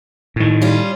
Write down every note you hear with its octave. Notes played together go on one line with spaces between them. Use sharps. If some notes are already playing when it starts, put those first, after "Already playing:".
A2 D#3
G3 C#4 F4